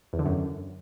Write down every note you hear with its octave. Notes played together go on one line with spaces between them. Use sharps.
E2
D3
F#2